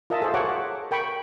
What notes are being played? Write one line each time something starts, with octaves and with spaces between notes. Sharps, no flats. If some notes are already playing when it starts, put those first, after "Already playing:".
F4 A#4 D#5 E5 A5
G#4 A4 C5
F#4 A4 A#4 C#5 F#5 D6
A#4 G5 B5 C#6